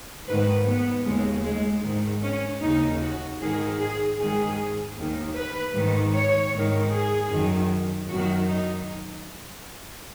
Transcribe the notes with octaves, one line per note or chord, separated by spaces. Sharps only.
G#2 D#3 B4
B3
D#2 C#3 G#3
G#3
G#2 D#3
C#4
D#2 C#3 D#4
F#4
G#2 D#3 G#4
G#4
G#2 D#3 G#4
D#2 D#3
B4
G#2 D#3
C#5
G#2 D#3
G#4
F#2 D#3
F#2 D#3 F#4
D#4